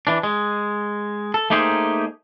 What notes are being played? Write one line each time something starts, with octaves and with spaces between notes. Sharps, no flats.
E3 D4
G#3
A4
A3 A#3 D#4 G4 G#4 C5